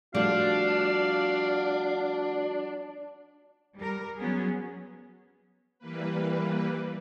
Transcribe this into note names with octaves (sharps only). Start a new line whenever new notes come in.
F3 G3 A3 D4 F#4 F5
G3 A#4
F#3 B3 C#4 G#4
E3 G3 A#3 B4